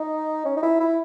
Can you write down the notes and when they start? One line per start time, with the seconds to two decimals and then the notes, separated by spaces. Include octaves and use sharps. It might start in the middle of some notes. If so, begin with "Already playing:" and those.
Already playing: D#4
0.45 C#4
0.57 D#4
0.63 E4
0.80 E4